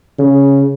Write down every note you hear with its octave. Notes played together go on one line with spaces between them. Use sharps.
C#3